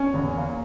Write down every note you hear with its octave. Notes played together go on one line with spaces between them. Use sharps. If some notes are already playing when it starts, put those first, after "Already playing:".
Already playing: C#4
E2
A#3